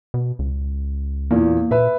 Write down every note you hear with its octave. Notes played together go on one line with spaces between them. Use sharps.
B2
C#2
E2 A#2 A#3
A#2 B4 E5